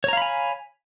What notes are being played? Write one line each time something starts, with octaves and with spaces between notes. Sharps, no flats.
C#5 F5 G#5 A#5 B5